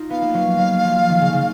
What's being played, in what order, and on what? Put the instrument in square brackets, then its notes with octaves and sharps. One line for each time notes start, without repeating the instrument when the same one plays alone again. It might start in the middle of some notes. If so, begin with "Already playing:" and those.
Already playing: [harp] D#4 F4
[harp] B3 [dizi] F5
[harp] A#3
F#3
F#3
F3
D#3
C#3
C#3